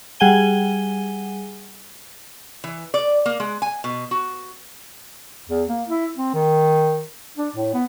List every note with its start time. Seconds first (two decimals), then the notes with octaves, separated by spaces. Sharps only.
0.20 G3 G#4 F#5 G#5 D#7 G7
2.64 E3
2.94 D5
3.26 A#3
3.40 G#3
3.62 G#5
3.84 B2
4.11 F#4
5.49 E2
5.69 A#3
5.88 E4
6.17 C4
6.34 D#3
7.38 D4
7.56 A2
7.74 B3